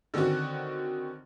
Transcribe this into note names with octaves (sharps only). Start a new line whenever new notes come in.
D3 D#3 C4 C#4 F#4